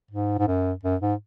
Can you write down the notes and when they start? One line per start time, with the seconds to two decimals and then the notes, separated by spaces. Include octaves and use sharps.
0.11 G#2
0.39 G#2
0.47 F#2
0.83 F#2
1.01 G#2